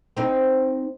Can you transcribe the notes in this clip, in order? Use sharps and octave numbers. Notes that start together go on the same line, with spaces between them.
C4 D#4